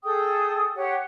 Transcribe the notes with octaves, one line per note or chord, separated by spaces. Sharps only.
G#4 A4 G5 D#6
G4 C#5 F#5